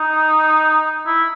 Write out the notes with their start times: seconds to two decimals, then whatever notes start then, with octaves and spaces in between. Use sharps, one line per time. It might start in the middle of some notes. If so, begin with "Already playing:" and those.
Already playing: D#4
1.07 E4